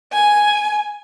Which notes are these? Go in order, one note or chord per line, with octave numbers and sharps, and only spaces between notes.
G#5